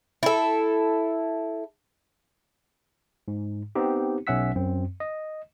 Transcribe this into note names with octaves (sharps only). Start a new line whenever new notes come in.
E4 A4
G#2
B3 C4 D#4 G4
B1 C#4 E5 F#5 E6 B6
F#2 C4
D#5